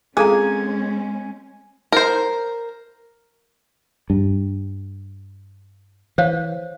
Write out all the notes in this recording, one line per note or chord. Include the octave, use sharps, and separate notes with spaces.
G#3 C4 C#4 G#4 A4 G#5 A#5
A#4 C5
G2
E3 C5 C#5 F5